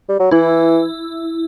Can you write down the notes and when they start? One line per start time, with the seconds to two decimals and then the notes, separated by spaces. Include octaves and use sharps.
0.09 G3
0.19 F#3
0.31 E3 E4